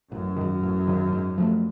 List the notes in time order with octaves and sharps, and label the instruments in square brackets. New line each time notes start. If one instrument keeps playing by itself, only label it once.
[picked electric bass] A1 [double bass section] F#2
[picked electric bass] G#2 D#3
A1
G#2 D#3
G#2
F3 A3